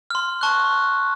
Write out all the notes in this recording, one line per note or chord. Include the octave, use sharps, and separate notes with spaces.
C6 F6
A5 C#6 F#6